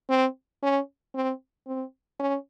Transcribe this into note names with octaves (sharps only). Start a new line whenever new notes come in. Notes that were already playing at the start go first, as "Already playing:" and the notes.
C4
C#4
C4
C4
C#4